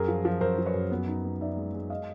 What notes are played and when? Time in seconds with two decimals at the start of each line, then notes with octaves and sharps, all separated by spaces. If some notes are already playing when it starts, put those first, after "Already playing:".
Already playing: F#2 G#4 A#4
0.08 F3
0.25 F3
0.41 F#2 A#4 C5
0.58 F3
0.66 B4 C#5
0.74 F#2
0.91 B3
1.07 D#4
1.24 B3
1.41 D#4 D5 E5
1.57 G#3
1.74 G#3
1.90 D#5 F5